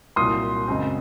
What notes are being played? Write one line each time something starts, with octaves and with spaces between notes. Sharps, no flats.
C2 A#2 F#3 C6 D#6
F#2 C#3 G#3 C4